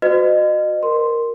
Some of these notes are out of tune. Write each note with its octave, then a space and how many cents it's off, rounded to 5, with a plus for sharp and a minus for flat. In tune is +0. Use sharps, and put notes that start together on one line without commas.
F#4 -15 C5 -45 D#5 -30
A#4 +0 C6 +0